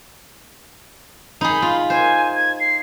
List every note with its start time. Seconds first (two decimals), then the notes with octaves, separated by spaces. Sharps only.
1.41 D#4 G#4 B5
1.62 F4
1.90 C5 G#5
2.36 G#6
2.60 C7